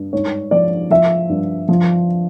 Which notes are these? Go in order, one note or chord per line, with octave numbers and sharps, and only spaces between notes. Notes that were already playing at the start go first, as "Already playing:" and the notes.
Already playing: G2
G#2 C#5
F3 D5
F3 E5
G2
F3